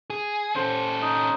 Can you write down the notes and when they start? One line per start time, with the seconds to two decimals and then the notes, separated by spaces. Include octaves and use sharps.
0.10 G#4
0.55 C#4 A4 C5
1.02 D#4